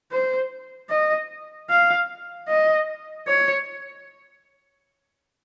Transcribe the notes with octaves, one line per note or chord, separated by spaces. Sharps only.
C5
D#5
F5
D#5
C#5